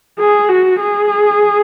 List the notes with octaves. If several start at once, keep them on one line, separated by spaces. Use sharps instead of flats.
G#4
F#4
G#4